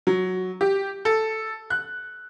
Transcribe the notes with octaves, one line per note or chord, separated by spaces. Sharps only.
F#3
G4
A4
F#6